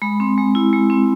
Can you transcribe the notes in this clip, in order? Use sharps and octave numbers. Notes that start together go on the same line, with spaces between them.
G#3 B5
C4
G#3
E4
G#3
C4